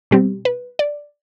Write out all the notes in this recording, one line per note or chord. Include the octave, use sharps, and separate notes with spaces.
B2 G3 C4 G4
B4
D5